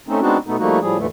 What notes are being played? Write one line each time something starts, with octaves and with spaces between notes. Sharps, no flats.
A3 C4 C#4 D#4
G#3 B3 C4 D4 D#4 F#4
B2 A3 B3 D#4
F3 G3 A3 A#3 D#4 F#4
A2 F3 G3 G#4
D#2 G#2 D3 E3 A3